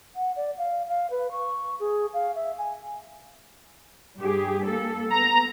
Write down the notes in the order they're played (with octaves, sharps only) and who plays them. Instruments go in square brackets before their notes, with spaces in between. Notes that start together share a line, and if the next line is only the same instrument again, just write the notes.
[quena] F#5
D5
F5
F5
B4
C#6
G#4
F5
E5
G#5
[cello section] G2 G4 G#4
A#3 A4
[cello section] B3 [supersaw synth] A#5